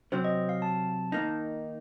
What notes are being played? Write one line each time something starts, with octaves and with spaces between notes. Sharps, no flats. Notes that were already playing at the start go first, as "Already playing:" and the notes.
C3 F#3 C4 C5
D#5
F5
A5
D#3 A#3 D#4